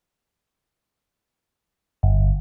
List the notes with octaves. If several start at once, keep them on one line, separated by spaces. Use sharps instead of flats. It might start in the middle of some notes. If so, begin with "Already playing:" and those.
G1